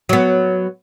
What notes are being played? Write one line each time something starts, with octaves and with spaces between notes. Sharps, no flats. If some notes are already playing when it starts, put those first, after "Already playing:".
F#3 B3